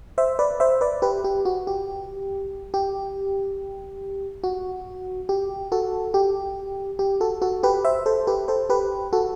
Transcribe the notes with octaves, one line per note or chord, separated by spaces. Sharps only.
C5 E5
B4 D5
C5 E5
B4 D5
G4 B4
G4
F#4
G4
G4
F#4
G4
F#4 A4
G4
G4
F#4 A4
F#4 A4
G4 B4
C5 E5
A4 C5
G4 B4
A4 C5
G4 B4
F#4 A4